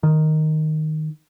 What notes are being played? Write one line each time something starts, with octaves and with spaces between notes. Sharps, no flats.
D#3